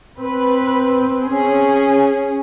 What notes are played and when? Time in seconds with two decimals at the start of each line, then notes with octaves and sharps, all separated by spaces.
0.22 C4 B4
1.25 C#4 G#4